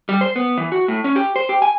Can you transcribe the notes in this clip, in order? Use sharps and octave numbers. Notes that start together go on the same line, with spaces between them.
G3
C5
B3
E3
F#4
A2
C#4
G4
C5
G4
G#5